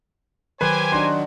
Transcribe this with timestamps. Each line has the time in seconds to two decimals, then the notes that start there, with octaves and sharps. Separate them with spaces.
0.61 D#3 F#3 G4 B4 C5 G#5
0.92 D4 D#4 F#4 C6